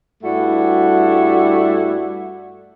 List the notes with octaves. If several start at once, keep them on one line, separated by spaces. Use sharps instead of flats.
G2 G3 A3 E4 F#4